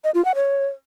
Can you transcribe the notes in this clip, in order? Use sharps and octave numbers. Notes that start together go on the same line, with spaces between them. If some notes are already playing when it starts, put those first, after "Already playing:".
D#5
F4
F#5
C#5